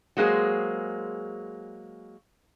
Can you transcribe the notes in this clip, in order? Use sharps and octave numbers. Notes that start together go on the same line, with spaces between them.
F#3 G#3 A#3 G#4 C5